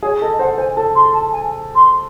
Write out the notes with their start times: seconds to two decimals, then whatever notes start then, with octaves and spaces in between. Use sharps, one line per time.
0.03 G#4 C#5
0.21 A4 D#5
0.39 C5 F#5
0.58 C5 G#5
0.76 A4 A5
0.95 C6
1.13 A5
1.32 G#5
1.75 C6